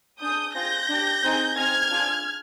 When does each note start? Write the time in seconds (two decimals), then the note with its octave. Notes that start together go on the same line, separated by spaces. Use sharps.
0.19 D4 G#4 D#6 G6
0.54 C4 F4 G#4 G6 A#6
0.89 D4 G4
1.23 C4 D#4 G#4
1.56 C4 D#4 G#4 F6 G#6
1.90 D4 F4 G#4